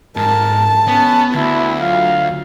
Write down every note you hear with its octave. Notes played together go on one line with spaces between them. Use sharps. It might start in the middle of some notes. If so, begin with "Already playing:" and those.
G#2 A#4 A5
B3 C#4
D2 B3 E4 F#4
F#3 F4 F5